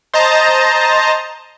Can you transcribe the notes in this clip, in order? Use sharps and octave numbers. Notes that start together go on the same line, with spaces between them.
C5 D#5 A5 A#5